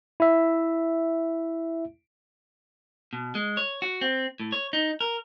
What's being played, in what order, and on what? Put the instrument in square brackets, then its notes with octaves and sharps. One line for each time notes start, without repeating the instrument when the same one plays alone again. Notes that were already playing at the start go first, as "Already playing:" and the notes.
[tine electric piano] E4 E5
[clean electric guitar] B2
G#3
C#5
F#4
C4
A2
C#5
D#4
A#4